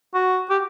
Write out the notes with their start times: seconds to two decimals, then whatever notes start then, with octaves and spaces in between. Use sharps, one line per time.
0.14 F#4
0.50 G4